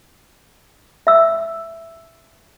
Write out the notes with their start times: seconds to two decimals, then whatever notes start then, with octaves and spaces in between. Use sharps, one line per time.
1.07 E5 E6